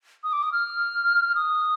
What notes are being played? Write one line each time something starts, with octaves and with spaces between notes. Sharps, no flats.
D#6
D6
D#6
F6
D#6